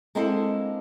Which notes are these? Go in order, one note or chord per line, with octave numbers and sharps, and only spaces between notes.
G#3 A#3 C4 D4 E4 A4